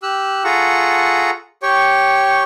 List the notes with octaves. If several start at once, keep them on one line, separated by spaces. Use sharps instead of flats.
G4 E6 F#6
F4 G#4 A4 F#5 A#5 C#6
G4 C#5 G5 C#6